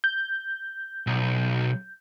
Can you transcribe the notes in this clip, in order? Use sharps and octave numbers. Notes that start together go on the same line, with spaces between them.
G6
B1